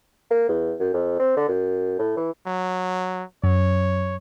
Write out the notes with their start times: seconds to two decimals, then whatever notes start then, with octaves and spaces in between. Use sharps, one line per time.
0.30 A#3
0.49 E2
0.79 F#2
0.93 F2
1.19 C4
1.36 D3
1.48 F#2
1.98 A2
2.17 E3
2.47 F#3
3.44 F#2 C#5